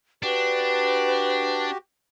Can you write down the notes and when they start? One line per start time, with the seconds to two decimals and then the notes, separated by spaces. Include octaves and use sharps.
0.23 D4 F#4 G4 B4